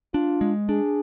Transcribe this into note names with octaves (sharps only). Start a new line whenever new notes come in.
D4 F4
G#3
D4 G#4